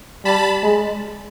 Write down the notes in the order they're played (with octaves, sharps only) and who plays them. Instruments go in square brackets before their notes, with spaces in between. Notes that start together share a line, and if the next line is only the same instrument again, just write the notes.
[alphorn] G3 [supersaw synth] A5 B5
[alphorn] G#3